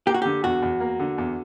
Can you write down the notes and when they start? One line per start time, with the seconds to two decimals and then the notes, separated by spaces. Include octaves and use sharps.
0.06 A#3 G4
0.14 F#4
0.22 D3 G4
0.44 E2 F#4
0.62 E2
0.80 A#3
1.00 D3
1.18 E2